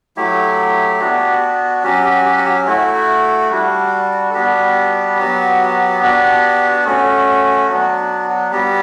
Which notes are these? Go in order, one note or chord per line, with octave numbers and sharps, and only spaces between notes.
F#3 A3 E4 G4
B3 D4 F#4
F#3 C#4 F#4 G4
G4
G4
F#4
G4
A3 E4 F#4
G3 D4 F#4
A4
G3 B3 D4 F#4 G4
F#3 B3 F#4
B3 D4 F#4
A3 C#4 F#4
F#3 B3 D4 F#4
G3 B3 F#4 G4